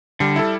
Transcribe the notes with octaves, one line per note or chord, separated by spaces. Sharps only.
D3 G3
E4 A4